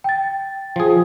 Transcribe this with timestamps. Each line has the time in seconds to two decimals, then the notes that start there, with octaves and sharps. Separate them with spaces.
0.04 G5 A6
0.76 F3 G#4